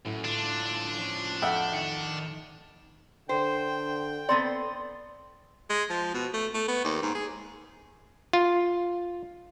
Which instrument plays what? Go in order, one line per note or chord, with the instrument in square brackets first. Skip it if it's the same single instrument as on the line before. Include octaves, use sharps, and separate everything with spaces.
[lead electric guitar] F#2 [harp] A2
[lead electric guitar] D3 F4 [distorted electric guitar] D4
[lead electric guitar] F3 C#4
[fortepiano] F2 E5 F#5 [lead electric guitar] G5
[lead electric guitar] D#3 [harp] C#7
[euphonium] D3 [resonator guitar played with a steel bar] C5 [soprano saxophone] G5
[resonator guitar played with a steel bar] B3 C4 A4 [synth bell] D5 C6
[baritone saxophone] G#3
F3
B2
A3
A3
B3
D#2
G#2
G#4
[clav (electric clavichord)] F4